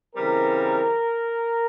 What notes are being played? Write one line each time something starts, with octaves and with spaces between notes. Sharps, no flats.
C#3 E3 G3 C4 A#4